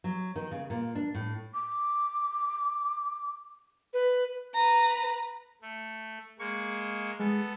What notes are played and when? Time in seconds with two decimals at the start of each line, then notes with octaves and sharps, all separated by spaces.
0.04 F#3
0.36 D#3
0.51 C#3
0.70 A#2
0.95 D4
1.15 A2
1.54 D6
3.93 B4
4.54 B4 A#5
5.62 A3
6.39 G#3 A#3 C#6
7.19 G#3 B3 A4